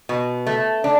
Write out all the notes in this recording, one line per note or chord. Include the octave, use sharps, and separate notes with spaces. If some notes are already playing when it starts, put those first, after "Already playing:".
B2
A3
D4